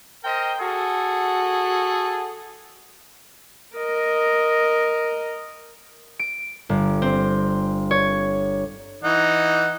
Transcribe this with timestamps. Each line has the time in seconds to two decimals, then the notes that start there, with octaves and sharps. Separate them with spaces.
0.24 A#4 C5 D#5 G5
0.60 F#4 G#4 A4
3.76 A#4 D#5
6.19 D7
6.69 G1
7.02 C4
7.91 C#5
9.04 E3 D#4 F#5